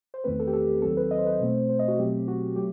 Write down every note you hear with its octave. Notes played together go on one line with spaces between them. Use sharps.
C5
E2 D#3 A3 C4 B4
A4
G4
A4
D#2 D#3 F#3 C4 A4
B4
D#5
C5
B4
C5
B2 A3 C4
C5
D#5
F#4
B2 F#3 A3 C4 G4
F#4
F#3 A3 G4